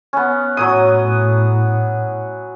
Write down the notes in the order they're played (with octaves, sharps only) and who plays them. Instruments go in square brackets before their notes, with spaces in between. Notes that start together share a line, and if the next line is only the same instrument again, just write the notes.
[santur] B3 C#4
[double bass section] A2 [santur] F#3 C#5 D#6